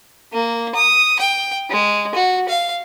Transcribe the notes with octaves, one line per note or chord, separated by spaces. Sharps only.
A#3
D#6
G5
G#3
F#4
F5